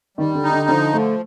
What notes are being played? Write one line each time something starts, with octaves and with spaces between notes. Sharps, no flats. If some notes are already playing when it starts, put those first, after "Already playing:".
D#3 G3
D3
D#4
D3
D3 F3
D3 A3